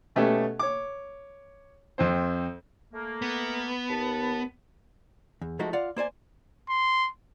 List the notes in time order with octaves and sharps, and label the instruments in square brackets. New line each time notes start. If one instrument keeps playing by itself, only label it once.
[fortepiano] B2 A3 B3 C#4 G4 A4
C#5 D6
F2 C4 C5
[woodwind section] A3 A#3
[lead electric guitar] B3
[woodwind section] D#2 A5
[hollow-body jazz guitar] E2
F3 G#3 A3 D#4 F#4
F4 D5 F5 F#5
A#3 C5 D5 G#5
[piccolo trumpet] C6